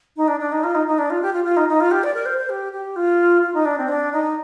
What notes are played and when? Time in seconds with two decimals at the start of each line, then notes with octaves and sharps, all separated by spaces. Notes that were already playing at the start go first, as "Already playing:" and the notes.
0.17 D#4
0.28 D4
0.40 D4
0.52 D#4
0.64 F4
0.75 D#4
0.87 D#4
0.98 D4
1.10 F4
1.22 G4
1.33 F4
1.44 F4
1.57 D#4
1.68 D#4
1.80 F4
1.91 G4
2.04 D5
2.14 A#4
2.26 C5
2.38 C5
2.49 G4
2.73 G4
2.96 F4
3.43 F4
3.54 D#4
3.65 D4
3.78 C4
3.89 D4
4.13 D#4